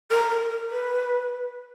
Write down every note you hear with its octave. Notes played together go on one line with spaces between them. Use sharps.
A#4
A#4
A#4
B4